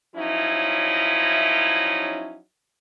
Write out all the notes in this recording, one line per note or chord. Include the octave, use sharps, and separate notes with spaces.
F3 F#3 C#4 D#4 E4